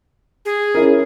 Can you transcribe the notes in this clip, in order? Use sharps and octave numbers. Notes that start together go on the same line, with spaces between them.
G#4
C#4 E4 A#4